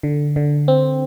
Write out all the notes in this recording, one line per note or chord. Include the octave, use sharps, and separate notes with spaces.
D3
D3
C4